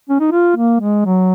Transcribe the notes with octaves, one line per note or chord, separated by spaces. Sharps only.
C#4
D#4
F4
A#3
G#3
F#3